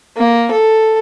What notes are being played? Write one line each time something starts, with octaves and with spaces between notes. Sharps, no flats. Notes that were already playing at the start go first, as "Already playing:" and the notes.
A#3
A4